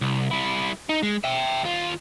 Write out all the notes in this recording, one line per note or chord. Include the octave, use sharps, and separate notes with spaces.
C2
G3 E4
D#4
G#3
E5 G5
D#2 F4